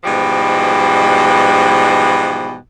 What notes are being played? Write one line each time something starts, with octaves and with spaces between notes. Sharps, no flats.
G#2 B2 E3 F3 G3